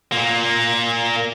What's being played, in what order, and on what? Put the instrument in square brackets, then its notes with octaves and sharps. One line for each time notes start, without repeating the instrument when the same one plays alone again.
[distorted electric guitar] A#2 A#3